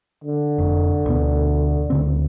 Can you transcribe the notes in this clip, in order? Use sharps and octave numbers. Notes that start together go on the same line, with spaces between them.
D3
F1
D2 B2 B3
D2 C#3 C4